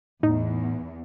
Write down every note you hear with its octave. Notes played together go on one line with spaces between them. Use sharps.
E2 A2 D#4